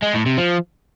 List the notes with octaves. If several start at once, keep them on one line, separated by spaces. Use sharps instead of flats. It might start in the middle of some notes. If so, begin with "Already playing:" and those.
G#3
A2
C3
F3